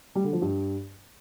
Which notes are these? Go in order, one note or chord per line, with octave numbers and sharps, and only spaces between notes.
G3
D3
F3
G2